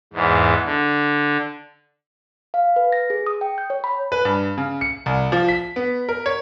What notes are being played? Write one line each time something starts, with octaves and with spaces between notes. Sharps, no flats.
E2 G#2
D3
F5
B4
A#6
G#4
D#6
G5
G6
C#5
B5
B4
G2
C#3
C#7
C2
F3
B6
B3
A#4
C#5